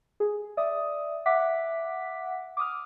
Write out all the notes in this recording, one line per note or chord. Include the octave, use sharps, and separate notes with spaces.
G#4
D5 E5 D#6
E5 F#5 D6 B6
D6 D#6 F6